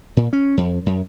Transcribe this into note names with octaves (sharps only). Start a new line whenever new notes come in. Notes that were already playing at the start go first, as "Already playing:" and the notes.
A#2
C#4
F2
F#2